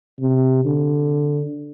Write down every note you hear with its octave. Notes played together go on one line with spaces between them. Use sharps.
C3
D3